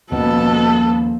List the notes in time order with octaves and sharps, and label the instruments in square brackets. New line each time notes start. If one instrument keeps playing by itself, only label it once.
[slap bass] D#2 G#2 C#4 [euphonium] B2 [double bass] F3 A#3 [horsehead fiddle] B3 A4